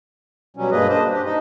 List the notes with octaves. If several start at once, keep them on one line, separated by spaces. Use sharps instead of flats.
B2 F#3 G3 C#4
G2 A#3 G#4 B4 D#5
D4 C5 D#5
D4 G4
D#4 D#5